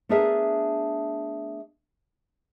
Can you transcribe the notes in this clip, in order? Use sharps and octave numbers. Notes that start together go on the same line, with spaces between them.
A3 B3 D4 G#4 A#4 E5